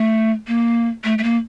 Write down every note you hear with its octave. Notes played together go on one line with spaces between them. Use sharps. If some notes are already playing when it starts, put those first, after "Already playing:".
Already playing: A3
A#3
A3
A3
A#3